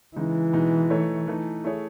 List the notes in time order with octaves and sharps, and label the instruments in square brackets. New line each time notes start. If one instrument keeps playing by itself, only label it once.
[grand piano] C#3 G#3 D#4 [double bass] E3
[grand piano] B2 G#3 D#4
A3 D#4 A4 C#5
E3 A3 D#4
A3 E4 G#4 C#5